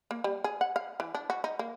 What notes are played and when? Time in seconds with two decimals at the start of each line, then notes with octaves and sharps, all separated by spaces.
0.11 A#3
0.24 G3
0.44 G#4
0.61 F#5
0.76 F5
1.00 E3
1.15 D4
1.30 F#4
1.44 D#4
1.59 A#3